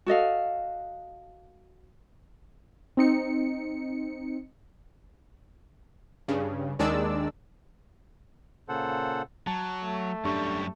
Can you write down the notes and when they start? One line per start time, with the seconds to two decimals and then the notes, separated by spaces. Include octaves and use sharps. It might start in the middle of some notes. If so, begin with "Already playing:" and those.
0.06 F#4 A4 D#5 F5
2.97 C4 D#4 C#7
6.28 G2 C#3
6.79 D#2 D#3 G#3 D4 D5 E6
8.69 A#2 C#3 A4 C5 F#5
9.47 F#3 A5
9.84 A3
10.25 F#2 G3 D4 G4 C#6